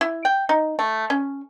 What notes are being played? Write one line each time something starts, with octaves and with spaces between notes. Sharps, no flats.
E4
G5
D#4
A3
C#4